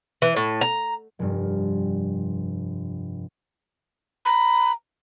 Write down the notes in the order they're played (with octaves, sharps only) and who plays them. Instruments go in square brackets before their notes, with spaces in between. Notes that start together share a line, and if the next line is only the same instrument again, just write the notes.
[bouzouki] E3
A2
A#5
[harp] F1 G2
[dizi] A#5 [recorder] B5